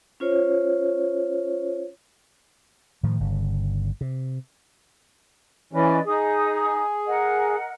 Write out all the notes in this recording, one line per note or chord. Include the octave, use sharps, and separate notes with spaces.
C#4 F4 C5 C#5
A2 D#3 F3
G1 C#3
C3
E3 C#4 B4 D5 D#5
D#4 G#4 D#6
A#4 D#5 F#5